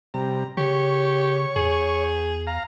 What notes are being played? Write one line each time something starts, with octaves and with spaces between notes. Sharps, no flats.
C3 G3 A#5
C#3 G4 C#5 C#6
E2 G#4
F5 A#5